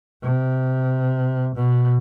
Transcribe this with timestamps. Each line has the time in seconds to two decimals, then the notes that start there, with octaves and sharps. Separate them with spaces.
0.22 C3
1.55 B2